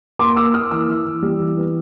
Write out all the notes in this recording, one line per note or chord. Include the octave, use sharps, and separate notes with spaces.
A#3 C6 D6
A#3 D6 E6
A#3 D#6 F6
E3 D6 E6
E3
E3
G3
E3
B3